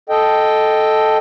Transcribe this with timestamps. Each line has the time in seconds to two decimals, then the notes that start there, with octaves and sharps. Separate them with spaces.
0.09 A4 D#5 G5